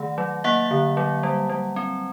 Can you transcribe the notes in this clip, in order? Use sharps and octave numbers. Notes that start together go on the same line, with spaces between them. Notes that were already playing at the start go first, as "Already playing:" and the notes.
Already playing: D#3 A3 F#5
F#3
A#3 E5 F#5
D3
F#3
G3
G3
C4